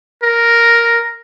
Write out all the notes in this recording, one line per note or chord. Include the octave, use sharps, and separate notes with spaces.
A#4